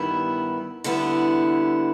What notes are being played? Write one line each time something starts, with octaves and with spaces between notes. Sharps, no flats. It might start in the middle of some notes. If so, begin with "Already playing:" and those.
Already playing: G2 D#3 G3 B3 E4
D3 G3 B3 E4